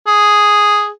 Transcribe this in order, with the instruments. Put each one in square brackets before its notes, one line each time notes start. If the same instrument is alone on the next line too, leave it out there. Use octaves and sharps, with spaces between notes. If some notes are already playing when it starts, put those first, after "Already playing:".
[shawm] G#4